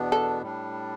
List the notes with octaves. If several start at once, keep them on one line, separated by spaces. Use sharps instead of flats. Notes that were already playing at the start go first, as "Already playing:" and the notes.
Already playing: E2 B2 B3 D4
A4
A2 G3 D4